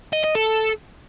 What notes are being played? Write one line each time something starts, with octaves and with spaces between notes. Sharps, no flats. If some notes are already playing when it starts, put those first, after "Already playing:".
D#5
D#5
A4